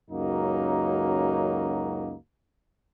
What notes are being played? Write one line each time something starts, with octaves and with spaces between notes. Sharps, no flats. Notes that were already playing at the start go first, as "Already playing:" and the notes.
C#2 F#2 F#3 A#3 D#4 F#4